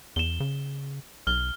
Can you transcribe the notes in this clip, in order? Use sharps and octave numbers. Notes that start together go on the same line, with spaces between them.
E2 E7 G7
C#3
B1 F6 G7